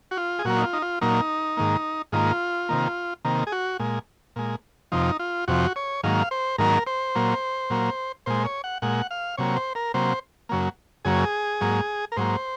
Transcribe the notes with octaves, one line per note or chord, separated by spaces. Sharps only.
F#4
F4
G#4
A#2 F#3 A#3 F#4
D#4
F4
D#4
F4
A#2 F#3 A#3 D#4
G#2 D#3 A#3
G#2 D#3 A#3 F4
C3 D#3 A#3
C3 D#3 A#3
G#4
F#4
A#2 G#3
A#2 G#3
F2 C3 F3 D#4
F4
F2 C3 F3 F#4
C#5
G#2 D#3 F#3 A#3 F5
C5
G#2 D#3 F#3 A#3 A#4
C5
A#2 F#3 A#3
A#2 F#3 A#3
A#2 G#3 C5
C#5
F#5
A#2 G#3 F#5
F5
C3 F#3 A#3 C#5
C5
A#4
C3 F#3 A#3 C5
F#2 C#3 F#3 A#3
F#2 C#3 F#3 A#3 G#4
G#2 F#3 A#3
A#4
G#2 F#3 A#3 C5